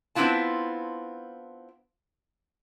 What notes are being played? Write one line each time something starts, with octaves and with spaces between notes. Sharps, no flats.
B3 C4 D4 E4 F4 A5